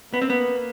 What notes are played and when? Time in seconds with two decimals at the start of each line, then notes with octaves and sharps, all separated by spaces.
0.14 A#3 B3
0.21 C4
0.30 B3